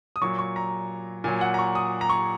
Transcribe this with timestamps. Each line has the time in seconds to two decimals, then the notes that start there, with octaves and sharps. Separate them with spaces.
0.16 D#6
0.22 A#2 F#3 C#6
0.39 C#6
0.56 A#5
1.24 A#2 F#3 G#5
1.41 F#5
1.54 A#5
1.59 C#6
1.75 D#6
2.01 A#5
2.09 C#6